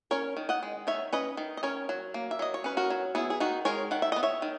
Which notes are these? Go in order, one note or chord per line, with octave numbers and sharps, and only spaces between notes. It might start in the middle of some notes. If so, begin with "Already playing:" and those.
C#4 A#4 C#5
D#3
D#5 F#5
G#3
D#3 C#5 E5
C#4 B4 D#5
D#3
D#5
C#4 A#4 C#5
F#3
A#3
E5
F#3 D#5
C#5
C#4 B4
F#4 A#4
F#3
B3 E4 G#4
G#4
D#3 D#4 F#4
G#3 A#4 C#5
D#3 F#5
E5
B3 D#5
C#5 E5
D#3